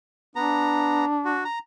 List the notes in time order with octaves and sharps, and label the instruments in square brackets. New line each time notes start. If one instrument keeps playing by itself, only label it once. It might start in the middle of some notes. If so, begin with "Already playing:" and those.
[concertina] B3 A#5 [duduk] D4
[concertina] F#4
A#5